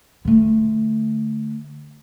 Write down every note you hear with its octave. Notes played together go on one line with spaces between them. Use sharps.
D3 A3